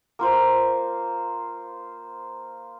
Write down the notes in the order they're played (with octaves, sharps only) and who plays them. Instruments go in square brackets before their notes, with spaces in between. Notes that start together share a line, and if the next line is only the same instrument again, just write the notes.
[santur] A#3 F4 C5